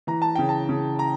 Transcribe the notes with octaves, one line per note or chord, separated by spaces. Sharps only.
E3 A#5
A5
C#3 G5
A5
C#3
A#5